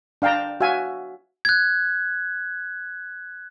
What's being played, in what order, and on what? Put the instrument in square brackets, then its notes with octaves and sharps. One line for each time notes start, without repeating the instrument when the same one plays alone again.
[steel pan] D4 F5 G5 A5 A#5
F#4 E5 F5 G#5
[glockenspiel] F#6 G#6